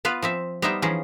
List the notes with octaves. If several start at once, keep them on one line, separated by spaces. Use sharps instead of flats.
B3 F4 B4 F5
F3 C4 E5
G3 B3 D#4 C5 E5 G5
E3 F3 C#4 D#4 G#4